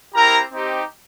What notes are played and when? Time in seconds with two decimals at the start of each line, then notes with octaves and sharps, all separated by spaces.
0.14 C4 E4 G4 A#4 A#5
0.52 C4 D#4 G4